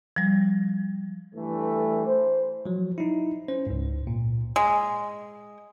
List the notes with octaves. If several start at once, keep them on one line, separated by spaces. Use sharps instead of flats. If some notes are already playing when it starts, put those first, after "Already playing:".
F3 G3
G2 E3 A3
C5
F3 F#3
D#4 E4
C#4 C5
C#2 G#2
A#2
G#3